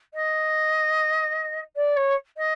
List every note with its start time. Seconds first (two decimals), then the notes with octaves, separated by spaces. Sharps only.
0.13 D#5
1.76 D5
1.96 C#5
2.37 D#5